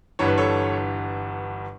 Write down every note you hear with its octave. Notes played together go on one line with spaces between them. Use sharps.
G1 G2 E3 C#5
B4
A4 C#5